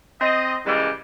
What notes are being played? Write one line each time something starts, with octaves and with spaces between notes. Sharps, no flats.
C4 D#5
C#3 E3 G3 G#3 A#3